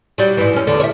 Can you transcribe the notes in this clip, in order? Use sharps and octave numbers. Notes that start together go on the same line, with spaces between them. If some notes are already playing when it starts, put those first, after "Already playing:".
F#3 G3
G#2 E3
F#2 C#4
E2 D3
C#5 E5